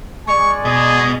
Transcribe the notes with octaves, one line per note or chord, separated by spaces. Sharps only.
G#3 D5 G#5 C#6
B2 G#4 D#5